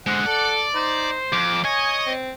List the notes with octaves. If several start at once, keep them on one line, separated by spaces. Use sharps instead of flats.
D3 G#3 C5 F#5
A4 D5
D#4 C5
F2 D6
C#5 D#5 G#5
C4